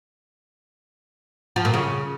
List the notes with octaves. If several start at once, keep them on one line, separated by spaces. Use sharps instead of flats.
F3
A#2
C#3